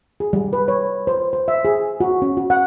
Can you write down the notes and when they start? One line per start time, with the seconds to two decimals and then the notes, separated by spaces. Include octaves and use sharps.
0.20 G#4
0.33 G3
0.53 B4
0.68 C#5
1.07 C5
1.33 C5
1.48 E5
1.65 G#4
2.00 F#4
2.22 C#4
2.37 F#4
2.50 F#5